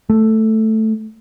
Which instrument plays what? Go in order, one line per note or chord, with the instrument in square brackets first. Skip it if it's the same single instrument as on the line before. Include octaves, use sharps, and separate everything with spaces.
[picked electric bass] A3